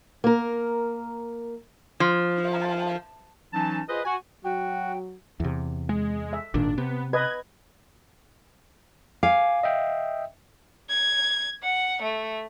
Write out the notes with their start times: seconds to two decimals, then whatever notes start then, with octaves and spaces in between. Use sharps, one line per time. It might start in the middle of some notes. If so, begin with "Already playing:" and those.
0.24 A#3 A#4
2.00 F3
3.52 E3 F#3 C#4 D#4 A5
3.88 F4 G#4 B4 C5 D#5
4.05 F#4 G#5
4.44 F#3 F#4 G5
5.40 E2 C3
5.89 G#3
6.33 E5
6.54 G#1 A#2 D#3 D4
6.78 C3 B3
7.13 B4 D#5 G#6
9.23 F5 G#5 D6
9.63 D#5 E5 G5
10.90 G#6
11.64 F#5
12.02 A3